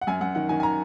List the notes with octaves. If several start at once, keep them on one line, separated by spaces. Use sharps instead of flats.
F#5
F#2 G#5
F#2 F#5
D#3 F#5
D#3 G#5
G#5
A#5